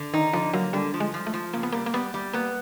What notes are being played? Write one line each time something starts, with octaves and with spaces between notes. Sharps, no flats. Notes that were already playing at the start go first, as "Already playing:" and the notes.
Already playing: D3
D#3 D#4
D3 F3
F#3 A#3
D3 G3
F3
G#3
F3
A3
F3
C#3 A#3
B3
G3 A#3
A#3
G3 B3
G3
A#3 B3